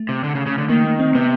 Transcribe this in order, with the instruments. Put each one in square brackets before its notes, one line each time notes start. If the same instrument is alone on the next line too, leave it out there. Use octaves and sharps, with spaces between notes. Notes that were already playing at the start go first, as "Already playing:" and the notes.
Already playing: [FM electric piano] A3
[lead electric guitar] C3
D3
C#3
C#3
D3
[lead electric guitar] D#3 [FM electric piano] A#3
[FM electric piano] A#3
C4
[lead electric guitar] C3 [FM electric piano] B3